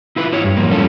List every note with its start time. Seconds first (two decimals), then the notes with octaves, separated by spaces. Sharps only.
0.16 E4 F4 B4
0.32 E4 G4 C#5
0.44 G2
0.57 F2 G#2 A#3
0.69 F2 F3 G3 C#4 A4